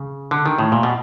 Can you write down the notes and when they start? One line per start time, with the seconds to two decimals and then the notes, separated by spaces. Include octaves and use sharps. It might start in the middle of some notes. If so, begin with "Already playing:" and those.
Already playing: C#3
0.31 D3
0.46 D#3
0.58 A2
0.72 A#2
0.83 B2